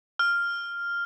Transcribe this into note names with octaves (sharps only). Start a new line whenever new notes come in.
F6